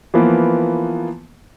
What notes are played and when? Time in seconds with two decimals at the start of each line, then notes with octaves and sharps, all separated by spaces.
0.14 E3 F3 A#3 B3